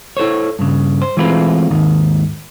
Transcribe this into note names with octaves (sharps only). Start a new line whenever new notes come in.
E4 A4 C5 C#5
G2 C#3
C5
E3 G#3 A3 C4 F4 B4
D#2 G#2 D#3